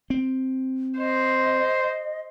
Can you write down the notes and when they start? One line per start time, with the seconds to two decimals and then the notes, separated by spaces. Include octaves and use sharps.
0.10 C4
0.98 C5 D#5